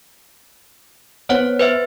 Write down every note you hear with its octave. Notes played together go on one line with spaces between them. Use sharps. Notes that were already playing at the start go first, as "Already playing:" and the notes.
B3 C5 C#5 F#5
B4 C5 E5